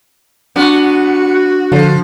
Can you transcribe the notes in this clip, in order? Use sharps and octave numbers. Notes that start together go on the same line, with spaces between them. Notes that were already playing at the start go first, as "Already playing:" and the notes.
B3 D4 F#4 C#6
D3 F3